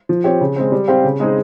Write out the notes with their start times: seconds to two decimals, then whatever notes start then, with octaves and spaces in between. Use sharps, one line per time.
0.09 F3
0.24 C4 G4 C#5
0.41 C#3
0.56 G#3 C4
0.72 G3
0.88 C4 G4 C5 F5
1.04 C#3
1.20 G#3 C4 D#4 G#4